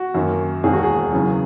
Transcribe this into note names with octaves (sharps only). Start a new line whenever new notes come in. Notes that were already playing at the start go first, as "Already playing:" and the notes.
Already playing: F#4
F#2 D#3 F#3 A#3
E1 D#2 D#3 G#4
F#4
G#4
E2 C#3 F#3 B3